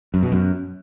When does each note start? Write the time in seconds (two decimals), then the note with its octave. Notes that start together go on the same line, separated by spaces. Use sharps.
0.14 F#2
0.23 B2
0.32 F#2